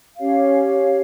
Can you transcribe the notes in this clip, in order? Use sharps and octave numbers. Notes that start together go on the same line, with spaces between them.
C#4 G4 C#5 F5